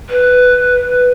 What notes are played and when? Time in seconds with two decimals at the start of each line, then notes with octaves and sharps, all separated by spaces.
0.10 B4